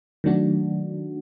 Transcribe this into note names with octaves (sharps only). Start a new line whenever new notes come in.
D#3 F#3 A3 D4 F#4